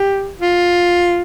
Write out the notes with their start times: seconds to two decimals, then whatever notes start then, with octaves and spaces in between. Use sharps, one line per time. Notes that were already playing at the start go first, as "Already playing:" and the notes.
Already playing: G4
0.41 F4